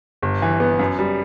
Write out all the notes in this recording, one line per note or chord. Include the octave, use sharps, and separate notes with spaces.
G1
E3
B3
F#2
G3